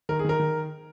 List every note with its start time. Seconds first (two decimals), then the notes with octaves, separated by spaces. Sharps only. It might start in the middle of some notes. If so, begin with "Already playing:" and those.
0.09 D#3 A#4
0.19 G#4
0.25 D#3 A#4
0.40 D#3